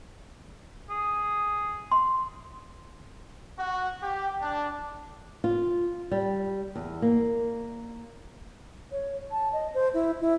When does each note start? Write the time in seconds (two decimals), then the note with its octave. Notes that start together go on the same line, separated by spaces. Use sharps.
0.90 G#4
1.91 C6
3.58 F#4
4.02 G4
4.41 D4
5.44 F4
6.11 G3
6.76 E2
7.02 A#3
8.92 C#5
9.31 A5
9.53 D#5
9.74 C5
9.94 E4
10.21 E4